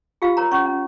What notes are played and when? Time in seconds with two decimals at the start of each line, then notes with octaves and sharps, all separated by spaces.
0.22 F4 G4 F5
0.37 A#4 C#5 A#5
0.51 C#4 C#5 C#6
0.66 C#4